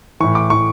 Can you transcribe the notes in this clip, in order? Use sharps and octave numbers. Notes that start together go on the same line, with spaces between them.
A2 E3 C#6
D6
A2 E3 C#6